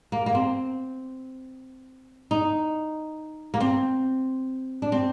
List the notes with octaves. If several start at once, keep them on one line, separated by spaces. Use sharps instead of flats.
A#3
A#3
C4
D#4
A#3
C4
D4
C4